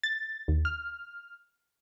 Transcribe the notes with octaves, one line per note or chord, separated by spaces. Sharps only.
A6
D#2
F6